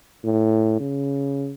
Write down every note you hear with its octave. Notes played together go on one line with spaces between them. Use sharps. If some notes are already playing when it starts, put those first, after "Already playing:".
A2
C#3